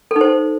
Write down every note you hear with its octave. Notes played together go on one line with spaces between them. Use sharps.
A4
D#4
C5